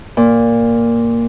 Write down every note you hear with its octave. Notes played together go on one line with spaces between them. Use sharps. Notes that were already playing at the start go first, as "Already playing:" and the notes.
A#2